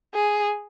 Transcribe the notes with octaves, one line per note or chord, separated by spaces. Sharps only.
G#4